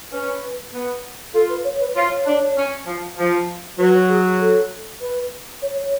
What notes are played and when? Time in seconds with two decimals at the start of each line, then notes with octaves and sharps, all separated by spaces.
0.12 C#4 B4
0.73 B3
1.34 F4 A4
1.49 B4
1.64 C#5
1.80 B4
1.95 F4 C#5
2.26 D4
2.57 C#4
2.86 F3
3.18 F3
3.79 F#3 B4
4.09 G#4
4.40 A4
5.01 B4
5.62 C#5
5.77 C#5